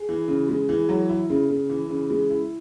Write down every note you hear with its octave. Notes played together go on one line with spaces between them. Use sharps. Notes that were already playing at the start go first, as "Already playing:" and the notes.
Already playing: G#4
E3
C#3
G#3
E3
F#3
E4
C#3
C#3
E3
C#3
G#3
E4